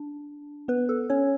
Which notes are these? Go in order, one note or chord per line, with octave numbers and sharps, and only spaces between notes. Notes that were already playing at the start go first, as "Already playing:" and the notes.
Already playing: D4
B3 B4
A4
C#4 C#5